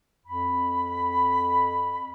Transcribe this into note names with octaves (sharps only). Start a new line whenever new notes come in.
F2 B5